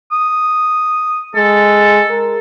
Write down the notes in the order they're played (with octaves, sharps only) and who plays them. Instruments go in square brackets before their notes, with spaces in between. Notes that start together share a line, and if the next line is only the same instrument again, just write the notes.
[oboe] D#6
[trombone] G#3 [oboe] A4
[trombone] A#4